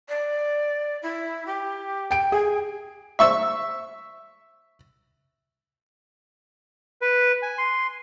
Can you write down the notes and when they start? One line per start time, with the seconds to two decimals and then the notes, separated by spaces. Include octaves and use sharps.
0.08 D5
1.02 E4
1.46 G4
2.11 G5 D7
2.32 G#4 G#5
3.19 E5 C#6 E6
7.01 B4
7.42 G#5
7.58 C6